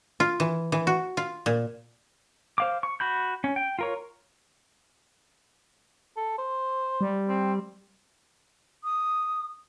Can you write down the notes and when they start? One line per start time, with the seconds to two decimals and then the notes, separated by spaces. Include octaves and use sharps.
0.20 F4
0.40 E3
0.72 E3
0.87 F#4
1.17 F4
1.46 A#2
2.58 C5 F5 D6
2.83 C#6
3.00 F#4 B5 G6
3.44 C#4
3.56 G5
3.79 F4 A#4 C#5
6.17 A4
6.38 C5
7.01 G3
7.28 C4
8.84 D#6